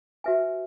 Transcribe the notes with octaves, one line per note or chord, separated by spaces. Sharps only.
F#4 B4 E5 G#5